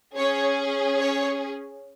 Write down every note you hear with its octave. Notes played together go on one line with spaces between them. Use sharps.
C#4 G#4 C#5
C#5